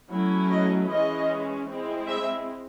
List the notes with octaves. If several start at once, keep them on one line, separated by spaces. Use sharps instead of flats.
F#3 A3 C#4 E4
D#5
E3 G#3 C#4 D#5
G#3 C4 E4
E5